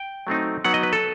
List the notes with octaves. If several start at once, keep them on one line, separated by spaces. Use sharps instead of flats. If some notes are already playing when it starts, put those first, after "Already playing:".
Already playing: G5
F#3 A3 C4 D#4
F#3 B3 D#4 F#5
D#5
B4
A4